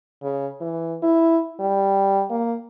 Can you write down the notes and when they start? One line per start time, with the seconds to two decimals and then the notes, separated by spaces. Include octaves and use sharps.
0.23 C#3
0.61 E3
1.03 E4
1.60 G3
2.31 A#3